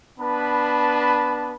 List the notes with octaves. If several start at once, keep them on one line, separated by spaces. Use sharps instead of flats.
B3 D4 B4 A5 B5